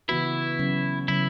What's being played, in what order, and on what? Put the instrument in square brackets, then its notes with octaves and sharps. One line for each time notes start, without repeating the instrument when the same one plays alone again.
[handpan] C#3 E3 B3 F#4 B4 [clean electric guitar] E4
[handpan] C#3 F#3 C#4
[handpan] C#3 F#3 C#4 [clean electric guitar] E4